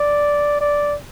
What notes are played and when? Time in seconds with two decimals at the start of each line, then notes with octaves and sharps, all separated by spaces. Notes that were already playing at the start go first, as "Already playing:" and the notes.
Already playing: D5
0.61 D5